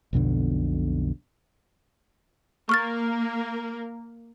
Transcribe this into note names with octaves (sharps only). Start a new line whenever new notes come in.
B1 F2 B2 D3
A#3 A#4 C#6 F6 A6